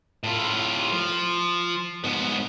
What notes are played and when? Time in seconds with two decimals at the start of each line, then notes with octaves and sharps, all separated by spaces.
0.24 A2 F4
0.92 F3
2.04 G#2 B3